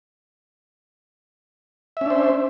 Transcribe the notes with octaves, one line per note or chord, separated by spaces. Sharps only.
C#4 D4 C5 E5